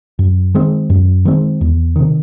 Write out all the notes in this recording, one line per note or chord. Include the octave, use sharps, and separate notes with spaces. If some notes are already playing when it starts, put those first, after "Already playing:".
F#2
D#3 G#3 C4
F#2
D#3 G#3 C4
E2
C3 D#3